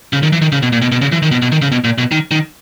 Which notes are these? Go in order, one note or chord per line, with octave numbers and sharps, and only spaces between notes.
C#3
D#3
E3
D#3
C#3
B2
A#2
B2
B2
C#3
E3
D#3
B2
B2
D#3
C#3
B2
A#2
B2
D#3
D#3